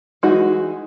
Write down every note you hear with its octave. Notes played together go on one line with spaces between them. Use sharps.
E3 G#3 D#4 F#4